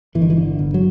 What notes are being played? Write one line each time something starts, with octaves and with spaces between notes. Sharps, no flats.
G1 E3
D#3
E3
D3
G1
F#3